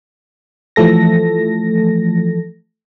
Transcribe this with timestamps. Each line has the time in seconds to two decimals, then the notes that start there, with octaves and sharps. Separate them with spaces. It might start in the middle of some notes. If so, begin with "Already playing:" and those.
0.76 E3 F3 A3 A4 A#6